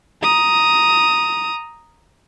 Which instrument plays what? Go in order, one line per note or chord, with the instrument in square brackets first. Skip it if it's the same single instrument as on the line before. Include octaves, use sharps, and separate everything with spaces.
[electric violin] A#5 D#6